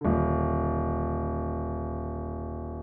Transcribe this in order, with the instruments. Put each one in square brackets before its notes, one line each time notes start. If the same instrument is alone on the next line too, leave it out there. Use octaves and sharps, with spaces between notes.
[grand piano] D#1 D3